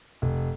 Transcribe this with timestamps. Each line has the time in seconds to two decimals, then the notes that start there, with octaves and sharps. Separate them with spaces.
0.22 F1